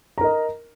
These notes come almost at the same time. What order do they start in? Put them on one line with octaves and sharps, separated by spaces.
A#5 A#4 D#5